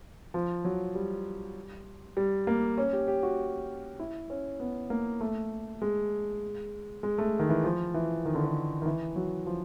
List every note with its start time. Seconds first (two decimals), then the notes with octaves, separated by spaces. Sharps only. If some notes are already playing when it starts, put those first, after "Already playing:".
0.34 F3
0.65 F#3
0.95 G3
2.17 G3
2.47 A#3
2.78 C#4
2.93 G4
3.08 G4
3.23 F#4
4.00 E4
4.30 C#4
4.60 B3
4.90 A#3
5.21 A3
5.82 G#3
7.03 G#3
7.18 A3
7.39 D#3
7.49 E3
7.64 F3
7.94 E3
8.25 D#3
8.35 D3
8.44 D#3
8.82 D#3
8.86 E3
9.16 F#3
9.46 F3